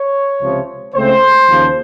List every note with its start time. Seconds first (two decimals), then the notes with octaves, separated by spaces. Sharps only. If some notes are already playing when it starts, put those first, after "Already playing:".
Already playing: C#5
0.41 C#2 C3 F3
0.95 C#2 C#3 A3 C4 C5
1.49 D#2 C#3 F3